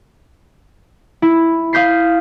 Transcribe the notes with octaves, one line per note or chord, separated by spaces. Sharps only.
E4
F5 D#6 G6 B6 C7